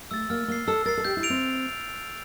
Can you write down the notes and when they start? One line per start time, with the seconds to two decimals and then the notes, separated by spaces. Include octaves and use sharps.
0.11 A3 E6 A6
0.30 A#3 F6
0.48 A#3 C7 G7
0.68 A4 E6
0.86 A#4 A6 C7
0.97 A4
1.05 G4 G6
1.17 E4
1.23 D7 F7
1.30 C4